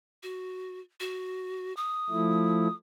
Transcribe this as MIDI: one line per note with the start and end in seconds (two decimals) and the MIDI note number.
0.23 0.80 66
1.00 1.75 66
1.77 2.74 87
2.10 2.68 53
2.10 2.68 57
2.10 2.68 64